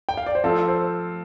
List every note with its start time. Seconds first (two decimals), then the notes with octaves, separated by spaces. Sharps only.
0.09 G5
0.17 F5
0.26 D5
0.35 C5
0.43 F3 A3 C4 F4 A4
0.68 C5